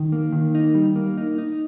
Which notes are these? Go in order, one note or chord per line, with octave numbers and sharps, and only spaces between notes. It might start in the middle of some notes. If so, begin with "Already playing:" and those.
Already playing: D#3
A#3
D#3
D#4
G3
A#3
D#4
D#4